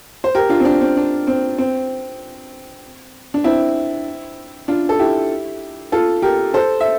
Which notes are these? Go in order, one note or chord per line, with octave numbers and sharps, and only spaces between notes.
C5
G4 A#4
D4 F4
C4
D4
C4
D4
C4
C4
D4
C4 E4
D4 F4
A4
E4 G4
F4 A4
G4 A#4
A4 C5
E5